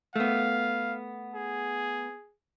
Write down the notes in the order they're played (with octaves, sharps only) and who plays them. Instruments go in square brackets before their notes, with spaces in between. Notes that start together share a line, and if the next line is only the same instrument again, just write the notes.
[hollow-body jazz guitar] A3 B3 [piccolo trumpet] F5
[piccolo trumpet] G#4